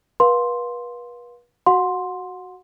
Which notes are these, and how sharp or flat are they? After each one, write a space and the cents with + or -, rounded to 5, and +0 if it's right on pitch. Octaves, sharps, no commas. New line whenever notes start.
B4 -35 F5 +25 C6 +0
F#4 +0 F#5 -30 C6 +0